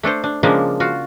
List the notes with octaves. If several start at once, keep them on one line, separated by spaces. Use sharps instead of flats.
A3 D4 A4 C5
D4
C#3 F3 G#3 A#3 D4
F4 F#4